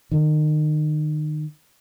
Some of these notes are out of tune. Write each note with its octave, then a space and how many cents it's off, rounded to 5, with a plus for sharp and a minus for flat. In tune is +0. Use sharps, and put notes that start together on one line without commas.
D#3 -30